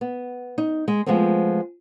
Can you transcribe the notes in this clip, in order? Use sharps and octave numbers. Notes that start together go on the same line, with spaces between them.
B3
D#4
G#3
F3 G#3 A3 B3 C4